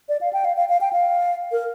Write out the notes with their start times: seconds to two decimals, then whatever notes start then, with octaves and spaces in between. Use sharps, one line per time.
0.09 D5
0.21 F5
0.33 G5
0.45 F5
0.57 F5
0.69 F5
0.81 G5
0.93 F5
1.52 A#4